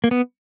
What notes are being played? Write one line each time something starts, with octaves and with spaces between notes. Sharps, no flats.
A#3
B3